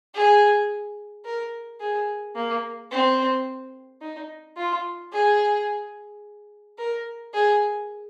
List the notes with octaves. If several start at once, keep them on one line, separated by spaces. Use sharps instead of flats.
G#4
A#4
G#4
A#3
C4
D#4
F4
G#4
A#4
G#4